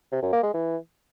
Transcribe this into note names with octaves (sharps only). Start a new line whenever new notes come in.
C3
F#2
A#3
G#3
E3